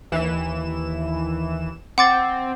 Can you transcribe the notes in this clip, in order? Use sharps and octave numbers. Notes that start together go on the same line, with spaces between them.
D#2 E3 E7
C4 F#5 D6 A6